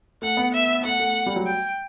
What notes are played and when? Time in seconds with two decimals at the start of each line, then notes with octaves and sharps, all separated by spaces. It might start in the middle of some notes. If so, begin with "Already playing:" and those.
0.22 A3 F#5
0.37 B3
0.53 E5
0.84 A3 F#5
1.00 A3
1.26 G3
1.36 F#3
1.46 G5